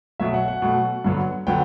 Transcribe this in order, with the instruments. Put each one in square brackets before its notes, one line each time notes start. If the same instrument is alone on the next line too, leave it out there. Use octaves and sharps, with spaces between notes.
[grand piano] B2 F#3 A3 E5
F#5
F#5
B2 F#3 A3
G2 D3 F#3 B3
D3 F#3 B3 G5